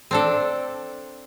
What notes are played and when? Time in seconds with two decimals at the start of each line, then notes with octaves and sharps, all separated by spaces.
0.11 C4 D4 A4